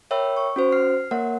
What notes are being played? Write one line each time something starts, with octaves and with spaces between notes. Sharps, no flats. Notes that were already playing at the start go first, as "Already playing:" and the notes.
A#4 C#5 E5 G5 B5 E6
C#6
C#4 F#4 C5
F6 C7
A#3 A#4 C#5 E5 F#5